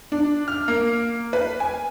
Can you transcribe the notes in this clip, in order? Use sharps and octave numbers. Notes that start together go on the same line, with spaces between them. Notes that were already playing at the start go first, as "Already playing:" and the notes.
D4
F6
A#3
B4
G#5